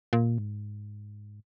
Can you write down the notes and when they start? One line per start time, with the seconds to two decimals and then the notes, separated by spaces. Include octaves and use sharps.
0.13 A#2
0.38 G#2